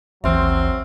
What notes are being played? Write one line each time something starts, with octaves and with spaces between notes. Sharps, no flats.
A1 D#2 E3 F#3 C4 E5 C6 F6